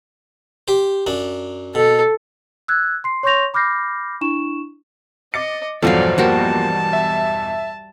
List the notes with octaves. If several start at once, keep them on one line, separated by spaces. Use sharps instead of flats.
G4 C5
F#2 D4
B2 A4
E6 F#6 G#6
C6 C7
C#5 C6 C#6 G6 A#6 F7
B5 D6 F6 G6 A#6 C7
D4 E4 C#6 E7
D#5 D6 A6 C#7
B1 E2 G2 F3 F#3 A4 D5 F5
F3 G3 A#3 F#4 A#4 C5 A5
E5